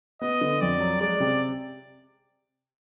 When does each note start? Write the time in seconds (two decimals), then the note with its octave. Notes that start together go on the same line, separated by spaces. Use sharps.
0.22 B3 D#5
0.41 D3
0.61 F2 D5
0.81 F#3
1.01 G#3 D5
1.20 C3